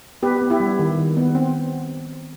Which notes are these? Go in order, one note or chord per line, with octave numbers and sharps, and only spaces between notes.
B3 G4 B4
B3
E4 G4
G3
D#3
D#3
B3
C4